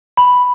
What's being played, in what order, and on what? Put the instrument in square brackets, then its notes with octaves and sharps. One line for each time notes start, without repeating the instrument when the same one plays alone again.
[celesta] B5